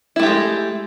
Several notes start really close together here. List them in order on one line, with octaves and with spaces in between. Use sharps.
E4 A3 G4 G#3